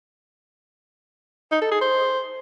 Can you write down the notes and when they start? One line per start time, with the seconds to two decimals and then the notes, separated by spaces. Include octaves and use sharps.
1.52 D#4
1.61 A4
1.71 G#4
1.81 C5